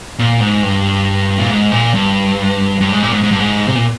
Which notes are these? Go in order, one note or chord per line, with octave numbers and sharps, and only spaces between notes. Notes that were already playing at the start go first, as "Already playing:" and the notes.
A#2
G#2
G2
A#2
G#2
A#2
G2
G2
G#2
A#2
G#2
G#2
G2
G#2
C3
A#2